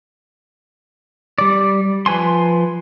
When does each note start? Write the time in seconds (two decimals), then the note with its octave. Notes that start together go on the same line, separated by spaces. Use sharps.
1.38 G3 D5
2.06 F3 B4 G#5 C6